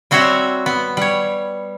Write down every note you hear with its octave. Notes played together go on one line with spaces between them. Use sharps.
G3 C4 F#4 C5 C#5 E5
B3
G3 C#5